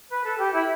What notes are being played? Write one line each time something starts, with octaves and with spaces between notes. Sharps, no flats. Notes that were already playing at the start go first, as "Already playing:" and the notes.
B4
A4
G4
E4